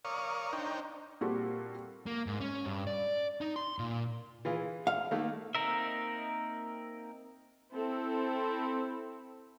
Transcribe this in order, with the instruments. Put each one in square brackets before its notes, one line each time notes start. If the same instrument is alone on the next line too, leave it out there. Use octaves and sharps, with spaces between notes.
[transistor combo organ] A#4 C#5 D5 F5 C#6 D#6
D4 D#4 C5 C#5 G5 A#5
[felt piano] A#2 G3 C4 F#4 G4 A4
[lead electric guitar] A#3
G#2
C#4
G2
D5
D#4
C6
A#2
[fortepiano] E3 F4 G#4
[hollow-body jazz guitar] F5
[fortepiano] D#3 A3 A#3
[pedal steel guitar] A#3 C4 D#4 A#4 E5
[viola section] C4 E4 A4